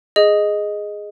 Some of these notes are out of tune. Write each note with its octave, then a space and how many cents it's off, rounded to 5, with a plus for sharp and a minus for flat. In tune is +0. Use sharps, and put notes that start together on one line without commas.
G#4 +0 D#5 +0